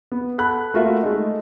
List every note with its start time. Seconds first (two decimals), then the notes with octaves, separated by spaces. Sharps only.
0.12 B3
0.38 A4 F#5 B5 F#6
0.74 A3 A#3 F4 F#4 A#4 E5
1.02 G#3 A3 D#4